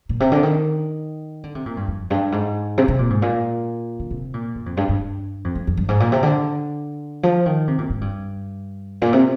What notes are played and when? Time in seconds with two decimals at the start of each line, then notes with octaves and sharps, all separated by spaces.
0.09 A#2
0.20 C3
0.32 D3
0.43 D#3
1.44 D3
1.55 C3
1.66 A#2
1.77 G2
1.88 F2
2.10 G2
2.32 G#2
2.78 C3
2.88 C3
2.99 A#2
3.10 G#2
3.22 A#2
4.00 D3
4.10 C3
4.34 A#2
4.55 G2
4.66 F2
4.77 G2
4.89 G2
5.44 F2
5.55 G2
5.67 F2
5.77 G2
5.88 G#2
6.00 A#2
6.12 C3
6.23 D3
7.23 F3
7.46 D#3
7.67 C3
7.78 A#2
7.90 G#2
8.01 G2
9.02 A#2
9.13 C3